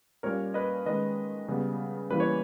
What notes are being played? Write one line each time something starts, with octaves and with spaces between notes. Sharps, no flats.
A#2 G3 A#3 C#4 A#4 C#5
B4 D#5
D#3 G#3 C#4 B4 D#5
C#3 G3 B3
E3 G3 A#3 C#4 B4
C#5